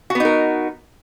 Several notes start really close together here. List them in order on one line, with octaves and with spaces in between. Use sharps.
F#4 B3 D#4 A#4